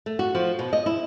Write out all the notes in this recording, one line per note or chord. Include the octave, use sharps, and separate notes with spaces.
A3
F#4
F3
B2
D#5
E4